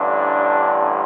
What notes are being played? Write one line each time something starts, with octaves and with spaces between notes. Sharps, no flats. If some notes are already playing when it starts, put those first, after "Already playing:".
Already playing: A1 G2 D3 D4